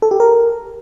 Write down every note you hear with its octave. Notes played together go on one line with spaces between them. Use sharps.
A4
G4
A#4